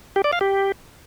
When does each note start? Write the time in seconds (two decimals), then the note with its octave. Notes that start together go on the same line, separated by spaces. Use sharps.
0.16 G4
0.24 D5
0.33 F5
0.41 G4